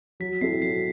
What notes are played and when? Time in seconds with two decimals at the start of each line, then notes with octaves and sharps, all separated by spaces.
0.20 F#3 B6
0.41 C4 E4 A4 C7
0.62 F#3 C7